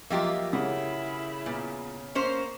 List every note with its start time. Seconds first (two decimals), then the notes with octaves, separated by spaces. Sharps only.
0.10 F3 F#3 A#3 F4 G4 D#5 E5
0.53 C#3 E4 F#5
1.46 A#2 B3
2.15 A#3 C#4 C5